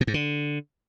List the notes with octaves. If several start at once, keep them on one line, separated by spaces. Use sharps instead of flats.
B2
G#2
D3